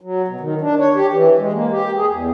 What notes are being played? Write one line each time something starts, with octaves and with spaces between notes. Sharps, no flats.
F#3
B2
D#3
D4
C#5
G4
E3
G#3
A#3
G4
G#4
E2